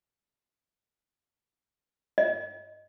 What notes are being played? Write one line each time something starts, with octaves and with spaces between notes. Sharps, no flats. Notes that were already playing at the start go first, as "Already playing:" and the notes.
D#5